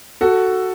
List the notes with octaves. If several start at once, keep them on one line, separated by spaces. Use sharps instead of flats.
F#4 A4